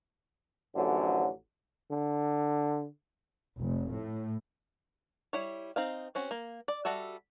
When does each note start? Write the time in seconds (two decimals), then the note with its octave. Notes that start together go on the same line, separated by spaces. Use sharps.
0.75 A1 F#2 D3 F3 F#3
1.91 D3
3.59 F1
3.92 A2
5.33 G3 E4 C#5
5.76 C4 D#4 F5
6.15 C4 C#4 F#4
6.31 A#3
6.68 D5
6.85 G3 F#4 A4 E5